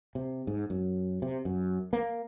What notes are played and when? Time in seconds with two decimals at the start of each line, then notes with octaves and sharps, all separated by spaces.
0.15 C3
0.47 G#2
0.70 F#2
1.22 C3
1.45 F#2
1.93 A#3